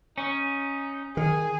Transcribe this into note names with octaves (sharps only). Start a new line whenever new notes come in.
C#4 D#4
D#3 G#4